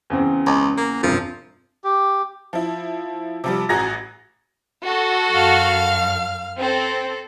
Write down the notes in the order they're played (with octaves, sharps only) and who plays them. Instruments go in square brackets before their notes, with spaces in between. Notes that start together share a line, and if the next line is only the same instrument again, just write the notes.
[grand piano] E2 C#3 C4
[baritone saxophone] C#2
A#3
[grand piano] E1 G2 C3 [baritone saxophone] F3
[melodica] G4
[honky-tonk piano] F3 E4
C3 F3 G3
A1 F#4 G#4 A#5 G#6 A#6
[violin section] F#4 A4
[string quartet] F#2 F5 F6
[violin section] C4 [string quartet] A4